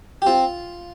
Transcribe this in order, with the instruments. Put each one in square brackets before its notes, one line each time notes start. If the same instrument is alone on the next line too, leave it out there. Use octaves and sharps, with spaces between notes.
[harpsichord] G4
C4 F4